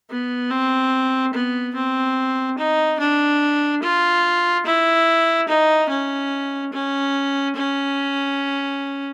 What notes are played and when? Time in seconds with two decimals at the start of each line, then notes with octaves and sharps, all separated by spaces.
0.10 B3
0.50 C4
1.34 B3
1.75 C4
2.58 D#4
3.00 D4
3.83 F4
4.66 E4
5.48 D#4
5.89 C#4
6.73 C#4
7.56 C#4